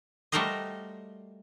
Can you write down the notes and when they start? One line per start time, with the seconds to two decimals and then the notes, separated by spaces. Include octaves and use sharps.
0.32 G3 A3 F#4 A#4 C5 D#5